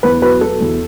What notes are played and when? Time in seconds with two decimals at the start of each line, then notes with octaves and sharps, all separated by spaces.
0.03 E2 B4
0.22 F#3 B4
0.41 B2 A4
0.61 E2